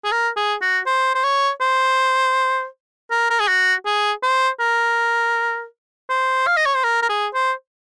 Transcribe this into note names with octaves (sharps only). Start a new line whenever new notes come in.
G#4
A#4
G#4
F#4
C5
C5
C#5
C5
A#4
A#4
G#4
F#4
G#4
C5
A#4
C5
F5
D#5
C#5
C5
A#4
A#4
G#4
C5